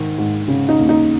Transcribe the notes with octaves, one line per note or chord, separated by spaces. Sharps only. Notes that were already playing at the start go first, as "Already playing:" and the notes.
Already playing: G#2 D#3
G#2
C#3
D#4
D#2
D#4